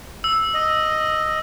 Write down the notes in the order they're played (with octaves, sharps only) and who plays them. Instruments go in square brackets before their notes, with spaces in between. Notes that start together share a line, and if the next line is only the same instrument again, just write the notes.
[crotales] E6
[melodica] D#5